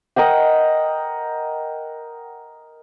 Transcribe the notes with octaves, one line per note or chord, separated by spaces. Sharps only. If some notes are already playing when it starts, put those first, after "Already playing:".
A#4 D#5 F#5 G5